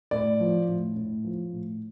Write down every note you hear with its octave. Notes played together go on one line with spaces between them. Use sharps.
A2 D5
F3
A2
A2
F3
A2